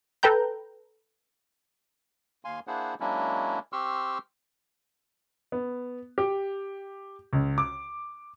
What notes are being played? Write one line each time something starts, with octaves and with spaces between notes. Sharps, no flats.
A4 B4 G5 A#5 G6
D#2 F5 G#5 C6
A#3 D4 E4 G#4 C5 F#5
F#3 G#3 A#3 C#4 D4 E4
C4 G4 C6 C#6 E6 F6
B3
G4
C#2
D6